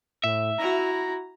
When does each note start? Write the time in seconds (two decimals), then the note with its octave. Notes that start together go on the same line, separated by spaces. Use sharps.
0.24 A2 E5
0.58 E4 F#4 A#5